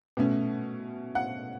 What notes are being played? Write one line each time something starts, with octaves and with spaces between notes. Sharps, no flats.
B2 A3 C#4
F#5